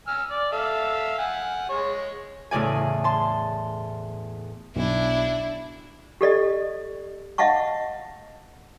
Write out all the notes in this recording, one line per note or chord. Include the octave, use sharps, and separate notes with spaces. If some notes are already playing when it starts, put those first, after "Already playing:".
G#5 E6 F6
D5
A4 E5 F5
F#5 G#5
G#3 C#5
E2 A2 C#3 D5 G#5
A5 C6
B1 D4 E4
G4 A4 D5 D#5
D#5 F5 F#5 A5 C#6